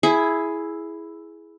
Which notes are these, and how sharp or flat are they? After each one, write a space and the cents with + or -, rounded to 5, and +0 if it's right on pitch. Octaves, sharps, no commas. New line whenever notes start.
E4 +0 G#4 +10